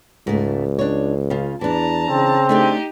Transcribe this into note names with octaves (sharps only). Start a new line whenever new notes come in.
C#2 G#2 A3
D4 C#5
C#3 F4
E2 E3 D4 A5 A#5
C#3 C4
A3 D4 D#4 G4 G#4